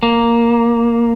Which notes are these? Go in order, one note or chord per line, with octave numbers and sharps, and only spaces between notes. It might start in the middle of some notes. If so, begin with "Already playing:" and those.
A#3